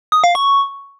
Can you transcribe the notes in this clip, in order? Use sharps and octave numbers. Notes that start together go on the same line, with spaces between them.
D#6
F5
C#6